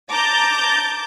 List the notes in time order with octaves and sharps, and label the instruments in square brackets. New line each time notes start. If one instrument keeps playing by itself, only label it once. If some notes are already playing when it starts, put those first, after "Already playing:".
[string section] A5 A#5 D6 G6 A6